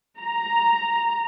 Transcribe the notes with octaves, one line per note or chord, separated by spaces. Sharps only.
A#5